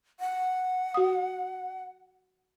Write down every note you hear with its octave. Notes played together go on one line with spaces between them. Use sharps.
F#5
F#4 D#6